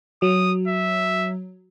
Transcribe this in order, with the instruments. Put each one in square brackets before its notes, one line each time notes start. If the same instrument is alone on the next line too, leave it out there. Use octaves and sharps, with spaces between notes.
[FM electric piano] F#3 [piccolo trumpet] D#6
[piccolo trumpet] E5